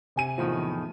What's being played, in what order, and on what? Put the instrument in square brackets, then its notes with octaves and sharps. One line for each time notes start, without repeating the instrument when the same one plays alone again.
[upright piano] C3 G#5 D#7
[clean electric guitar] E2 A2 D#3 [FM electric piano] F3